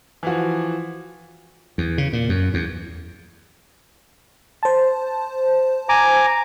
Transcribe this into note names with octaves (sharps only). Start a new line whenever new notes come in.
E3 F3 F#4
E2
C#3
A#2
F#2
E2
C5 A5
G#5 A#5 D6